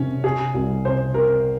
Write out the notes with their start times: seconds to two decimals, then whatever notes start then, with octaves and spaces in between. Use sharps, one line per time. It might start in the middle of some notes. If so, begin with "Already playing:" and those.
Already playing: C3 D#3 C#4
0.24 C3 G#4
0.54 C2
0.85 C3 C5
1.14 C4 A#4